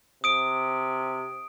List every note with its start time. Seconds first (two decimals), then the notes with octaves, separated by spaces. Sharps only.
0.24 C3 D#6 D7